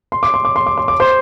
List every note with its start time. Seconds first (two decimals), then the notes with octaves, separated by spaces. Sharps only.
0.12 C6
0.23 D6
0.34 C6
0.45 D6
0.56 C6
0.66 D6
0.78 C6
0.88 D6
1.00 C5 C6